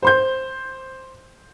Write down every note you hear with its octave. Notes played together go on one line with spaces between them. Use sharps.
C5 C6 G6